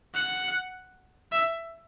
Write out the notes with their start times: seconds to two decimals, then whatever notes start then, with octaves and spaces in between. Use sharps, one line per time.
0.15 F#5
1.32 E5